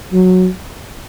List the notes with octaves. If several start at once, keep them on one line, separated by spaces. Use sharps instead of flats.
F#3